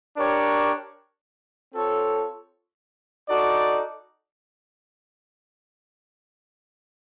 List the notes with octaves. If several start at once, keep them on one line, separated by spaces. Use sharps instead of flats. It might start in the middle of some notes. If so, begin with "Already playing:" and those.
D4 G4 A#4 C#5
C4 F4 A4 C#5
D#4 F#4 A4 D5